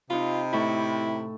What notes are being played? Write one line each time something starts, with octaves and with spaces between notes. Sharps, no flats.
C3 D#4 F4 B5
A2 E4 A4 C#6